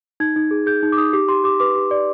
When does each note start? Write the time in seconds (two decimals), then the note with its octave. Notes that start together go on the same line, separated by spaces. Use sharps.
0.20 D#4 G#6
0.36 D#4
0.51 G#4
0.66 G#4 G6
0.83 D#4
0.92 D6
0.97 D#4 D#6
1.13 G4 D6
1.28 G4 C6
1.44 G4 D6
1.60 B4 D6
1.75 G4
1.91 D5